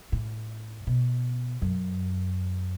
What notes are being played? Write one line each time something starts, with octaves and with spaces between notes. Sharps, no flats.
A2
B2
F#2